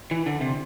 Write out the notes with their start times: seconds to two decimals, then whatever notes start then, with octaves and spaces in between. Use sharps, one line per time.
0.11 E3
0.26 D3
0.41 C3